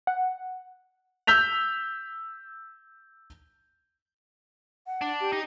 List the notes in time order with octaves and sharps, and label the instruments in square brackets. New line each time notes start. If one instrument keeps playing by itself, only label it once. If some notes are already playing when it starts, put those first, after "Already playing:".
[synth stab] F#5
[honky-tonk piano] E6 G6 B6 F7
[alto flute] F#5
[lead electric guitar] D4
[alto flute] G4
[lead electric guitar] D#4